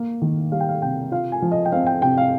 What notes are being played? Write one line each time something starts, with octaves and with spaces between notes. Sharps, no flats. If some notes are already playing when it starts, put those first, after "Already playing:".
Already playing: A#3
D#3
G3 F5
G5
F5
C3 G5
F4 F5
G#5
F3
D#5
G5
C4 F5
G5
C3 G5
F5